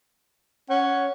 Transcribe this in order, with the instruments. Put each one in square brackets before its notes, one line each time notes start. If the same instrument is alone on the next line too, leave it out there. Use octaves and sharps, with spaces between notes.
[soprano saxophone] C#4 [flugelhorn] F#5